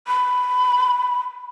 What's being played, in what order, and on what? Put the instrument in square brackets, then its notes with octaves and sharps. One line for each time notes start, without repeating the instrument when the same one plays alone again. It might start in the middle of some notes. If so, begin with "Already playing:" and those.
[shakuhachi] B5